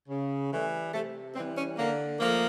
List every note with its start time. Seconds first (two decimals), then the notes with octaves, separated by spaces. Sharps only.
0.08 C#3
0.51 E3 G3 A3
0.93 C3 A3
1.35 E3 G3 C4
1.56 C#4
1.77 D3 A#3
2.20 F3 A3 A#3